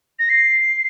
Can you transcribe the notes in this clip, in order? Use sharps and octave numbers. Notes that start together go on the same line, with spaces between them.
A#6
C7